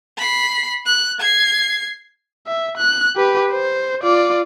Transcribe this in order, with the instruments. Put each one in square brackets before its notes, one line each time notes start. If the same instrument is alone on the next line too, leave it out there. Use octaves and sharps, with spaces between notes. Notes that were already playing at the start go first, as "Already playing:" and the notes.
[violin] B5 C7
F#6
G#6 C7
[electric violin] E5
F#6
G4 B4
C5
F4 D5